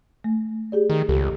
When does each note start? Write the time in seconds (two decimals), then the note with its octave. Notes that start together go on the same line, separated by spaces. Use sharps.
0.24 A3
0.72 G4 G#4 D5
0.90 D#3
1.09 C#2 G4 A4